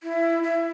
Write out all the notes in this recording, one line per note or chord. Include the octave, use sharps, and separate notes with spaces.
E4
E4